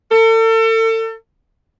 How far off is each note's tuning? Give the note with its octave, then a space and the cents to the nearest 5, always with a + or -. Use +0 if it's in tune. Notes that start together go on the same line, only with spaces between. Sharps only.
A4 +35